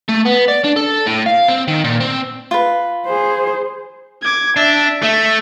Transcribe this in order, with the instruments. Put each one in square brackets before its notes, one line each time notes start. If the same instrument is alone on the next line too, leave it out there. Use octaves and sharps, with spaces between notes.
[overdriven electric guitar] A3
B3
D5
D4
A4
A2
F5
C4
D#3
A#2
C4
[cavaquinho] F4 B4
[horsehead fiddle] G#4 C5
[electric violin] D6 G#6
[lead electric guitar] D4 [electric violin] E5
[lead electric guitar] A3 [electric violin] E5